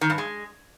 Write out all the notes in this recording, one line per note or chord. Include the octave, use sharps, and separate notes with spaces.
D#3
G2
G#3